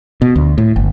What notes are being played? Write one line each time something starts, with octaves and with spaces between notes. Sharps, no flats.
B2
D2
A2
G1